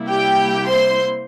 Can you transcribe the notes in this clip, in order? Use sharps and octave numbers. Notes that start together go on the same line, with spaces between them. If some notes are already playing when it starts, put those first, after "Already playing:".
Already playing: C3 G3 A#3 E4
G4 G5
C5 C6